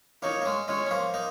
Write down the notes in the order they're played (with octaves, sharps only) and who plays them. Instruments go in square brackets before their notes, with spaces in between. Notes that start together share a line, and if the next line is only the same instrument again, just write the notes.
[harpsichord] A#3 D#4 [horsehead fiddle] C#5
[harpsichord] A#3
G#3 C#4
[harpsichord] G#3 C#4 [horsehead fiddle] C#5
[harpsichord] C#4
F3 A#3
A#3 D#4